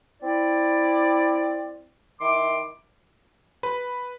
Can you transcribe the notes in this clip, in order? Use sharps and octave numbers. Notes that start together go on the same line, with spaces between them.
C4 E4 D5
D#3 E4 C6 D6
B4